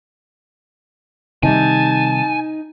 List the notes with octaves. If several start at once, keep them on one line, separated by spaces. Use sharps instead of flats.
C3 D#3 G3 D#4 G#5 A5